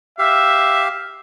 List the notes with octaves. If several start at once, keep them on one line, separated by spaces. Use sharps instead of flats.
G4 E5 F5